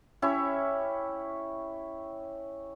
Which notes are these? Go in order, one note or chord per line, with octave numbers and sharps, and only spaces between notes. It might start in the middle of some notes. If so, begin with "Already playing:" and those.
C#4 E4 G4 C#5